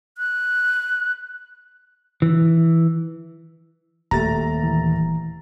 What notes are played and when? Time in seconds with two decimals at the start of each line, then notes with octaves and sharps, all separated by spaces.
0.18 F#6
2.22 E3
4.11 D#1 A#2 G3 A3 A#5 A6
4.64 E3